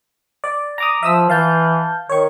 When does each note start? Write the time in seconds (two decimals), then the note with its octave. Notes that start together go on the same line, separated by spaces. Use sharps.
0.44 D5
0.78 A#5 D6 D#6
1.03 F3 E5 D#6 E6
1.30 E3 F5 A5 G6
2.10 D#3 C#5 C#6